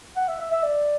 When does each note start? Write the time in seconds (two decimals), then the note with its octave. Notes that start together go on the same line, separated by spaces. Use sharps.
0.16 F#5
0.28 E5
0.40 E5
0.51 E5
0.63 D5